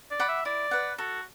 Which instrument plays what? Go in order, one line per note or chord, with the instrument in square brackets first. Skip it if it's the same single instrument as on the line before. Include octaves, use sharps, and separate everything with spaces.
[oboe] D5
[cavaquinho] F#5 B5 D6
[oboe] E5
[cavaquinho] E4 [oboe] D5
[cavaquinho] B4 F#5
[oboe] F#4 [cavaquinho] A4